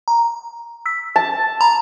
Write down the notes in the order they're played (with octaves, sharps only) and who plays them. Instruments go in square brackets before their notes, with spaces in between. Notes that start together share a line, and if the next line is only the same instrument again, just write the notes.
[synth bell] A#5
E6 B6
[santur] A5
[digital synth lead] A#5 [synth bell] B5